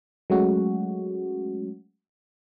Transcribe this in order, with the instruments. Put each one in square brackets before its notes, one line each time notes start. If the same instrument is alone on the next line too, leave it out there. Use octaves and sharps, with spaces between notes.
[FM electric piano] F#3 G#3 A3 C#4 F#4